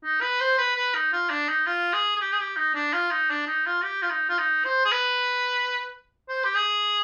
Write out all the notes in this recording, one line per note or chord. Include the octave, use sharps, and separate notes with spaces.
D#4
B4
C5
B4
B4
D#4
F4
D4
D#4
F4
G#4
G#4
G4
G#4
G4
D#4
D4
F4
D#4
D4
D#4
F4
G4
F4
D#4
F4
D#4
C5
G#4
B4
C5
G4
G#4